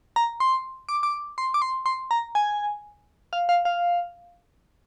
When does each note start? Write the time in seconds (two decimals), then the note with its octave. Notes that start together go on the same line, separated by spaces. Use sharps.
0.16 A#5
0.40 C6
0.89 D6
1.03 D6
1.38 C6
1.54 D6
1.62 C6
1.86 C6
2.11 A#5
2.35 G#5
3.33 F5
3.49 F5
3.65 F5